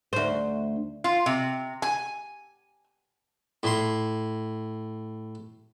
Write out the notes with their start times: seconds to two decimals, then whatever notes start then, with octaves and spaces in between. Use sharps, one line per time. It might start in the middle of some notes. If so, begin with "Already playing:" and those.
0.13 D2 C5
1.04 F4
1.26 C3
1.82 G#5
3.63 A2 C6